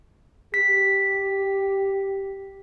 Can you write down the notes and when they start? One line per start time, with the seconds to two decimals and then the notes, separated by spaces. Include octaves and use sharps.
0.54 G4 B6